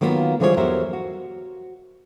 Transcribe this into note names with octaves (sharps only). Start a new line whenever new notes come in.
D#3 F#3 A#3 B3 F4
D3 E3 F3 G3 G#4 C#5
E2 F#3 G4 A#4 C5 E5
F#4